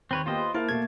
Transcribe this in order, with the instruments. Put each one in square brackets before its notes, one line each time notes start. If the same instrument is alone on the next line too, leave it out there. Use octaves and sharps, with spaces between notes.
[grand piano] D#2 [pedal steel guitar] C4 B4 C#5
[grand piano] A#3 B3 G4 [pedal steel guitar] F4 C5 D#5
[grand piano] B4
[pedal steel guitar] A#3 A5 [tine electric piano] E4 [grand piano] A#4 C5 F5
[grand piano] B2 A3 [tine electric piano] G#6